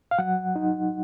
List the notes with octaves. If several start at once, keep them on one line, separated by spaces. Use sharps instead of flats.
F5
F#3 F#5
D#4